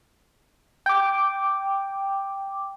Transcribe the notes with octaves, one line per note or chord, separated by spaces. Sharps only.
G5 D6